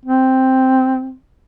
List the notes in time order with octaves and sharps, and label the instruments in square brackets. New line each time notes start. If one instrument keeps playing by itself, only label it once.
[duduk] C4